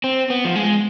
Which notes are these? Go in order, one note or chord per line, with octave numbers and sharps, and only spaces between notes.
C4
B3
F3
G#3